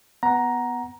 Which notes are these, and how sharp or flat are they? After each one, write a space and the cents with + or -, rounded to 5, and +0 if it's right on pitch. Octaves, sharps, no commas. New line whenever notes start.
B3 +0 F#5 +0 A#5 +10